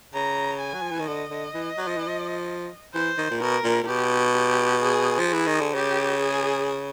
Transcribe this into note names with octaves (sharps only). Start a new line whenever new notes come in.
C#3 A#5
G#5
F#3
F3
E3
D#3
D3 D#5
D3
E3
F#3
F3
E3
F3
E3 C5
D#3
A#2
B2 A#4
A#2
A#2
B2 G4
G4
G#4
F3
G#4
E3
D#3
D3
C#3 G4
G#4